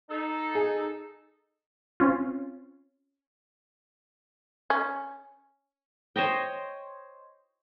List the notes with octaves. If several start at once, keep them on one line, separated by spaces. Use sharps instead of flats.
D#4 A4
G#4
C4 C#4 F4
C#4
C5 C#5 D#5 G5